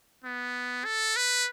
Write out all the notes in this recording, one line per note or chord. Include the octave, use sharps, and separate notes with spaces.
B3
A4
B4